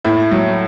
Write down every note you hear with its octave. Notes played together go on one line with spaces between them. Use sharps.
A2 E4
F#3